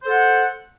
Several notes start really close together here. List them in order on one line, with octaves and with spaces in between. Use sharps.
C5 A4 F#5